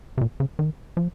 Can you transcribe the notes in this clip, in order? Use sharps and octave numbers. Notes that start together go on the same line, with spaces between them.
C3
A#2
C#3
D#3
F3